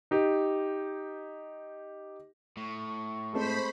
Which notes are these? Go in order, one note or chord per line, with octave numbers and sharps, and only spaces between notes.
D#4 G4
A2 C#6
G#3 A3 C4 C5 B5